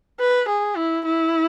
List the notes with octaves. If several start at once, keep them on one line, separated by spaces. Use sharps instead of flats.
B4
G#4
E4
E4